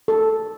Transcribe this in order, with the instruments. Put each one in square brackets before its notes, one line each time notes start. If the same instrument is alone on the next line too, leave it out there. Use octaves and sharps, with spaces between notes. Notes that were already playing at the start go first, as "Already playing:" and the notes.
[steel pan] A4